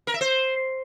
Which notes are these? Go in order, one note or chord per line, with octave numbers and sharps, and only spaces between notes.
A#4
E5
C5